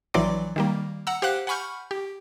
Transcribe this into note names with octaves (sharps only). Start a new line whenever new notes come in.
A#1 E3 F#3 D5 C6 D6
D#3 G3 A#3
F#5 A#5 E6
G4 C5 F5 F#5 F#6
F#5 G#5 B5 C#6 F6 G6
G4